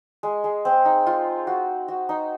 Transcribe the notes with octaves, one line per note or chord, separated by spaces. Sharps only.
G#3
G#3
C4
D#4
F4
F#4
F#4
D#4